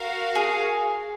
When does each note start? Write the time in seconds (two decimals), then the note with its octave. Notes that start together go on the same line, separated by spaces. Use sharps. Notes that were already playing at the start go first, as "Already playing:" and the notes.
Already playing: F#4 A#4 F5
0.35 G#4